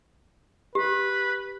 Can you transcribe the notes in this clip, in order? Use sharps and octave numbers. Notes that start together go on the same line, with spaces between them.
G4 B4